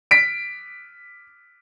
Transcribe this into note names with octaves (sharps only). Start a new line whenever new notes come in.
B6 D7